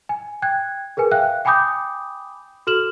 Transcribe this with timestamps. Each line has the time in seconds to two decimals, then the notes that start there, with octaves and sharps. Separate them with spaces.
0.09 G#5
0.42 G5 F#6 G#6
0.97 G#4 A#4 B4 G#5
1.11 E5 F5 G5 F#6
1.45 G5 G#5 B5 D6 D#6 G6
2.67 F#4 A4 F6 E7 F#7